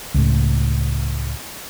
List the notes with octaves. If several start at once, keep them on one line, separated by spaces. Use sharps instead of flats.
C#2 A2